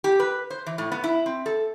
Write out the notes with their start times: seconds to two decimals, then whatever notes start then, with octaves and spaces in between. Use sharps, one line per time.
0.04 G4
0.20 B4
0.50 C5
0.66 E3
0.78 A2
0.92 B3
1.04 E4
1.26 C4
1.46 A4